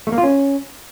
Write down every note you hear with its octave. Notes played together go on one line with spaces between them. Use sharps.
A3
A#3
F4
C#4